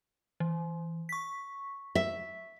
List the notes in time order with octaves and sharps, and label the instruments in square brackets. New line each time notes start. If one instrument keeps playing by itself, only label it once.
[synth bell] E3
C#6 B6
[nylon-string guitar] E5